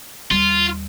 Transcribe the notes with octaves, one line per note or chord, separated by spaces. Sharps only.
D#2 G3 F4